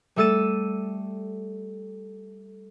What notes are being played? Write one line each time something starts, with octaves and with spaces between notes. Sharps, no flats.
G3 A3 A4 E6 A6 D#7